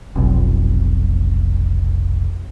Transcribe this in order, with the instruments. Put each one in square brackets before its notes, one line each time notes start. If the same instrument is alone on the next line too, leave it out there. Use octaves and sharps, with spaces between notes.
[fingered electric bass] F1 B1